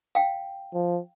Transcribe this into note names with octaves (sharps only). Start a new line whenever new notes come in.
F5 G5
F3